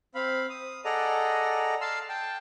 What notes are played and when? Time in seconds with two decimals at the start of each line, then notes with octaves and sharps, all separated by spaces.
0.15 C4 F5 B5
0.50 D#6
0.85 G#4 A4 D5 D#5 F#5 A#5
1.81 F5 A5 C6 E6
2.09 G5 A5